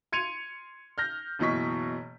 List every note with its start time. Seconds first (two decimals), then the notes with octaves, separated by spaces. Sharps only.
0.12 C6 G#6 C#7 D#7 F7
0.98 F6 G6 A#6
1.39 F#1 B2 E3 D#5 C#6 B6